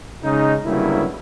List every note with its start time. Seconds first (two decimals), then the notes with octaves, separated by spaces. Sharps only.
0.24 C#3 G#3 D#4
0.65 G1 G2 C#3 F#3 A#3 E4